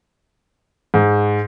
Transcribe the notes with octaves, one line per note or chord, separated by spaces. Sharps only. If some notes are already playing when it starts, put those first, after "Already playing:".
G#2